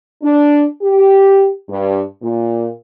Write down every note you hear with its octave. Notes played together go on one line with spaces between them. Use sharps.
D4
G4
G2
A#2